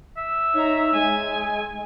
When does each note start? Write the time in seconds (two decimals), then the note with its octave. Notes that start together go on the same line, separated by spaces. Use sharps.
0.18 E5
0.54 D#4 C#5 A#5
0.94 G#3 G#5